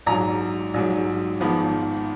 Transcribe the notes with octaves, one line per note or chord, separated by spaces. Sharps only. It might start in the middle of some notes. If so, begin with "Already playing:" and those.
A#1 G#2 F#3 A#5
A#1 G#2 F#3
G#1 G#2 F3 B3